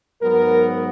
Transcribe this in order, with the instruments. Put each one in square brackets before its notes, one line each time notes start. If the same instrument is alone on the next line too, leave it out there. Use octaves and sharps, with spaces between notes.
[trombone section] G#2 F#3 B3 A#4